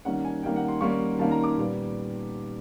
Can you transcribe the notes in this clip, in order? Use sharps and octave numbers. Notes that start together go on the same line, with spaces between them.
D#3 G3 A#3 C#4 F#5
G#5
D#3 G3 A#3 C#4 G5
F#5
C6
D#3 G3 A#3 C#4 C#6
D#3 G3 A#3 C#4 A5
A#5
D6
A#2 G3 B3